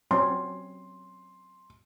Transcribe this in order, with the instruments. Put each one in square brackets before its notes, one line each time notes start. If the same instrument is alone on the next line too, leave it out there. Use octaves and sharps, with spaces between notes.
[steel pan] F#3 C4 C#4 [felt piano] C6